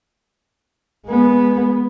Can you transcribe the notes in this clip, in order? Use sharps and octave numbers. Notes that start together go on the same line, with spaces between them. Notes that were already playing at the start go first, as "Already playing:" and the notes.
G#3 B3